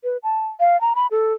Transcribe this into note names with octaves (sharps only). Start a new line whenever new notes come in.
B4
A5
F5
A#5
B5
A4